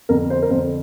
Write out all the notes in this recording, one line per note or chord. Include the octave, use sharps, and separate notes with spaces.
F2 D3 A#4
C5
A#4
F2 D3 C5